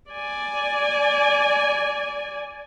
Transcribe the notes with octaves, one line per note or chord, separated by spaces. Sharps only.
D5 G#5